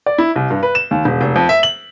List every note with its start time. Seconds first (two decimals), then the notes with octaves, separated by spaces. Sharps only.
0.06 D5
0.18 E4
0.36 C2
0.50 G2
0.63 B4
0.75 E7
0.91 D#2
1.05 E1
1.21 F1
1.36 F2
1.49 E5
1.63 F#7